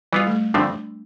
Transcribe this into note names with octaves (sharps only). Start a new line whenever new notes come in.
E3 G3 B3 F4
A3
G2 D3 F3 A3 C4 D4